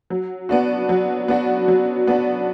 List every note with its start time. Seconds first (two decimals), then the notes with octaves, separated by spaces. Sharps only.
0.10 F#3
0.49 B3 D4 F#4
0.89 F#3
1.28 B3 D4 F#4
1.68 F#3
2.07 B3 D4 F#4